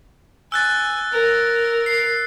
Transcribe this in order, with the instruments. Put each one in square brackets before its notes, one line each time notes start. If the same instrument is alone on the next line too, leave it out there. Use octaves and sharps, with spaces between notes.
[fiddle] G#5 [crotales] E6 F#6 A6
[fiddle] A#4
[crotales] C7